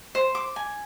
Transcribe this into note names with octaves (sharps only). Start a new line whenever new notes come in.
C5
D6
G#5